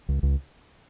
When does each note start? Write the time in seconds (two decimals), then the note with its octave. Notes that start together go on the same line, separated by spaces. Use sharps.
0.09 C#2
0.23 C#2